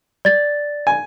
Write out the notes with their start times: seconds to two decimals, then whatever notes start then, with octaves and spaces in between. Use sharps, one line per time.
0.25 D5 A6
0.87 G#5